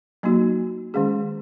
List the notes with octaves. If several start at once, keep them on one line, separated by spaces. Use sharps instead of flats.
F#3 A#3 D#4 F#4
D#3 G#3 C#4 G#4